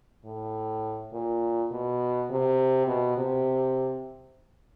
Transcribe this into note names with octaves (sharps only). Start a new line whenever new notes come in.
A2
A#2
B2
C3
B2
C3